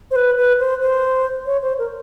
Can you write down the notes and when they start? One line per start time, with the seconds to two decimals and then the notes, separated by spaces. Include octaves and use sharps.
0.11 C5
0.16 B4
0.38 B4
0.59 C5
0.81 C5
1.46 C#5
1.62 C5
1.79 A#4